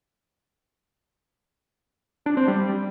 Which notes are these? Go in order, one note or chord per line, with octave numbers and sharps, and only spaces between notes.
D4
C4
G3